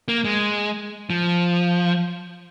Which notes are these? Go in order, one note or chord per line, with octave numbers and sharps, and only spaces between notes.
A#3
G#3
F3